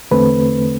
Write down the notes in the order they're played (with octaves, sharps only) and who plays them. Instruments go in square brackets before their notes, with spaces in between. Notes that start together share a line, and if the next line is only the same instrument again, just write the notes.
[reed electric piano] E2 D3 A3 C4 B4